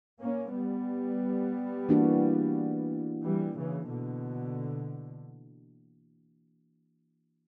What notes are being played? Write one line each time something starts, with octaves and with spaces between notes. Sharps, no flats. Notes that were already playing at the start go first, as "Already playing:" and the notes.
A#3 C#4
G3 B3
E3 A#3 D4 F#4
E3 G3
C#3 E3
B2 D3